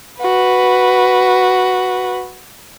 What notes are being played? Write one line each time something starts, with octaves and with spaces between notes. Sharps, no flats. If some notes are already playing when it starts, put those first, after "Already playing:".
F#4 B4